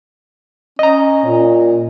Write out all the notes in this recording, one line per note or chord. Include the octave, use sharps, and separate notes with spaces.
C#4 D#5 A#5
A#2